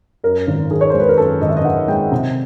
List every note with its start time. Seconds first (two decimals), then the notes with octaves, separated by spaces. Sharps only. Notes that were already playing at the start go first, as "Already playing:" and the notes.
0.24 F#2 A#4
0.47 G#1
0.70 D#3 G#4
0.81 C#5
0.90 C5
0.94 G#3
0.99 B4
1.09 A#4
1.18 F#2 A4
1.41 G#1 D#5
1.49 E5
1.57 D#5
1.64 D#3 F#5
1.88 G#3 G5
2.12 C3